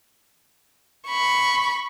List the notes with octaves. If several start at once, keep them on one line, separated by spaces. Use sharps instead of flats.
B5 C#6